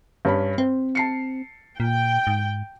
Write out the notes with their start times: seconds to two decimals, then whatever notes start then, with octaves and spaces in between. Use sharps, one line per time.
0.25 G2 C#4 B5
0.58 C4 C5
0.95 A5 C7 C#7
1.80 A#2 G5
2.27 G#2